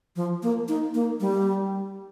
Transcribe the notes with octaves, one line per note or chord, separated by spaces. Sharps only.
F3
A#3
D#4
A#3
G3